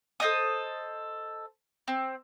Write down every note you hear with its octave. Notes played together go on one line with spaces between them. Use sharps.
A4 C5 D#5 D#6
C4